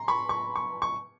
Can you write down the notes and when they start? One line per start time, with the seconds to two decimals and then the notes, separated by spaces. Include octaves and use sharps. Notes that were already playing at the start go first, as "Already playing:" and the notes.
Already playing: A#5 C6
0.08 B5 C#6
0.29 C#6
0.56 C#6
0.82 C#6